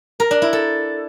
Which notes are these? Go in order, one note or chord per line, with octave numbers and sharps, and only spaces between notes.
A#4
D4
E4
A4